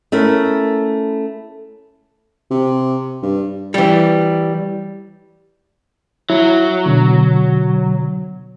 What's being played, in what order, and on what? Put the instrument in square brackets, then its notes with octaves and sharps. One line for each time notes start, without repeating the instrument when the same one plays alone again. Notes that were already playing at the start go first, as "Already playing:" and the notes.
[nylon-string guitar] A3 C#4 E4 A#4
[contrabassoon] C3
G2
[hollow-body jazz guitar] E3 G3
[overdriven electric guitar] F#3 [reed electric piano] E4
[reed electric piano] B2 D3